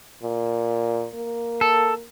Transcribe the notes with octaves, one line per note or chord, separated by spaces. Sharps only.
A#2
A#3
A4